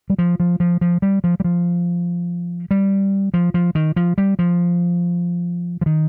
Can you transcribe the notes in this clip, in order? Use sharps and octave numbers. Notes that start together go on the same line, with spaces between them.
G3
F3
F3
F3
F3
G3
F3
G3
F3
G3
F3
F3
D#3
F3
G3
F3
F3
D#3